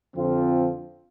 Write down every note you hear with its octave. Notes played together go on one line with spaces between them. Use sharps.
F2 D3 F3 C4 F4